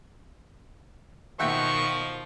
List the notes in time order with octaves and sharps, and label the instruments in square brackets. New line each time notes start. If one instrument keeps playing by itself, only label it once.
[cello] B2 D#3 [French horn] F3 [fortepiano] E5 F#5 G5 [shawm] C#6